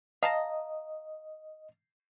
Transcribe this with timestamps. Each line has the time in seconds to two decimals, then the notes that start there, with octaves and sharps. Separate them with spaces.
0.23 D#5 F5 A5 A#5